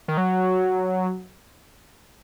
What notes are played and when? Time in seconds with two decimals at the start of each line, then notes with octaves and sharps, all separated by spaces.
0.08 D#3
0.17 F#3